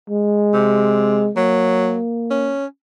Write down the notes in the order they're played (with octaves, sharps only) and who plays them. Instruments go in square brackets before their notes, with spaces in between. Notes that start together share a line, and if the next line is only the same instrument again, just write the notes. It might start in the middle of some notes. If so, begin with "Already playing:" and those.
[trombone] G#3
[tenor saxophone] C3
[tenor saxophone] F#3 [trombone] A#3
[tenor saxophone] C#4